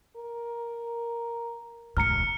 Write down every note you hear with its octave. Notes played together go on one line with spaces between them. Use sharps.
A#4
E1 D2 G#2 A#5 F6 C#7